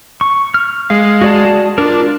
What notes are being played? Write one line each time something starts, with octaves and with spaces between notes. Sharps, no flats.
C#6
F6
G#3 F5
F#4 D5 A5
D4 F4 A#4